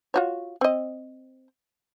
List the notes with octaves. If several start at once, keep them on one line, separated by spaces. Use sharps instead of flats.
F4 F#4 C#5
C4 D#5